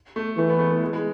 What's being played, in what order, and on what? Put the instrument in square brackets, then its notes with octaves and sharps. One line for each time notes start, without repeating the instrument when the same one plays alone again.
[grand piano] A3
[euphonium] E3 [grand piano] A3
[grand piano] B3
A3
A3
G#3
G#3